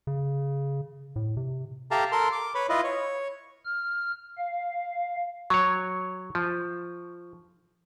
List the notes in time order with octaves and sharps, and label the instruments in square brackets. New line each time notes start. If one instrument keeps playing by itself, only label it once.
[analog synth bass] C#3
A2
C3
[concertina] G4 A4 E5 F5 A5 A#5
A4 A#4 C6
D6
B4 C#5 B5
E4 F4 B4 D#5
C#5
[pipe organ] F6
F5
[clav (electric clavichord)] F#3 C#5 [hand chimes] C#6
[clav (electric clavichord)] F3